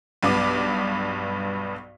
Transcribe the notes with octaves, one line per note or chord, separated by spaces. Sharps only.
B1 G2 B3 D6